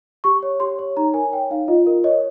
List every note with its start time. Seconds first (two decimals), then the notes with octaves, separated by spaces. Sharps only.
0.24 G4 C#6
0.43 C#5
0.60 G4 C6
0.79 C#5
0.97 D#4 A#5
1.14 A#4 G#5
1.33 C#5 G5
1.50 D#4 F5
1.68 F4 D#5
1.87 A#4
2.04 C#5 D#5